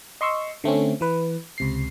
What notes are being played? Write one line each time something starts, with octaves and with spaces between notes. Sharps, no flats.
D#5 C6 C#6 E6
D3 A3 C4 C#4
E3 B4
C#2 C3 C7